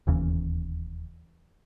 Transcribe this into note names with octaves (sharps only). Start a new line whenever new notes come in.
E1 D#2 C#3 E3